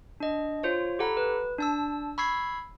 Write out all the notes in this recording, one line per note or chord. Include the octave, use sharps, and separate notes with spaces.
D4 D#5
F4 C5 C#5
G4 A4 F#5 A#5 B5
B4
D4 A5 E6
B5 C#6 E6 G#6 C7